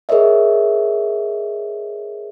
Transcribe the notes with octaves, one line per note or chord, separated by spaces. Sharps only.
G#4 A#4 C5 C#5 D#5 E5